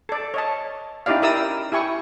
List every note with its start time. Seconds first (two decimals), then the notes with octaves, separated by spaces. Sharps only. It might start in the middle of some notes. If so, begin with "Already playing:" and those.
0.09 A4 D5
0.34 C#5 D#5 A5
1.06 C#4 D#4 E4 G4 D5 F5
1.22 E4 G4 A#4 D5 D#6 E6
1.72 E4 G4 G#5 C#6